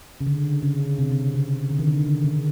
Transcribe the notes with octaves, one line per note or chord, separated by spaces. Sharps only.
C#3
D3
C#3
C3
C#3
D3
D#3
D3
C#3
C#3